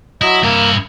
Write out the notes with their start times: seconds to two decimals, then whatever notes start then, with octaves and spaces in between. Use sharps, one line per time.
0.21 F#3 E4 D#5
0.43 G2 A#3 E4